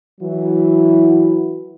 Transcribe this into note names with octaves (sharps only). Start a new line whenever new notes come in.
E3 F#3 E4 F#4